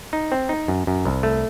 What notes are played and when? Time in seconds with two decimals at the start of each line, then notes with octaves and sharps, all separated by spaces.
0.13 D#4
0.32 C4
0.49 D#4
0.68 F#2
0.87 F#2
1.05 C2
1.23 A3